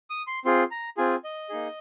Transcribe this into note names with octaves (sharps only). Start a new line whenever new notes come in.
D#6
C6
C4 F4 G#4 C6
A#5
C4 F4 G#4 G#5
D#5
A#3 D#4 G#4